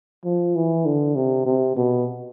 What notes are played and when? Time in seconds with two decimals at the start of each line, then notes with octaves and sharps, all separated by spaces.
0.25 F3
0.56 E3
0.86 D3
1.16 C3
1.46 C3
1.76 B2